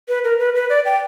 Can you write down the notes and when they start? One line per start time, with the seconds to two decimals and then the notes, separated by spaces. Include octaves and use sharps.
0.08 B4
0.24 A#4
0.39 B4
0.55 B4
0.70 D5
0.85 G5